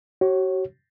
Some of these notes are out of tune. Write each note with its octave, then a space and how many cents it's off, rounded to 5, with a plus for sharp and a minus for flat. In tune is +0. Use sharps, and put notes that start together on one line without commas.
F#4 +40 C#5 -20